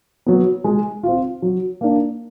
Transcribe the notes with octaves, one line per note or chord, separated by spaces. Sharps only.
F#3 B3
G#3
C4 F4
F#3
A#3 D4